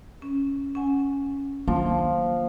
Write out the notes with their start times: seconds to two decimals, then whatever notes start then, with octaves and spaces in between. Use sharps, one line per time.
0.22 C#4
0.75 C#4 F#5 G#5
1.68 D#3 F3 F#3 A#3 D4